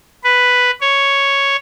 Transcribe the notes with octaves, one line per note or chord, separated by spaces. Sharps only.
B4
C#5